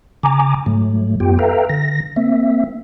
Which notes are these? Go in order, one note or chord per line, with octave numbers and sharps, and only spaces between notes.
C#3 G#5 A#5 D6
G#2 F#3 A3
F#2 B3 F4 G4 G5
A4 B4 E5 F5 G5 A#5
D3 A#6
A#3 C4 E5